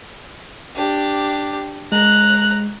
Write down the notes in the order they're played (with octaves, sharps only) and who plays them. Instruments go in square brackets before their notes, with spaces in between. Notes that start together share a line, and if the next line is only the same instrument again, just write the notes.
[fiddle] D4 G4
[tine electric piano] G#3 [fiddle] A#5 F#6